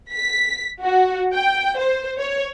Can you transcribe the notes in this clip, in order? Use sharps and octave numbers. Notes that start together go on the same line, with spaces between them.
B6
F#4
G5
C5
C#5